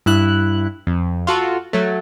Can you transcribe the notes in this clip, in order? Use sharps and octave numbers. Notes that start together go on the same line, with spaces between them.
G2 E4 F#6
F2
F4 F#4 A4
F#3 A3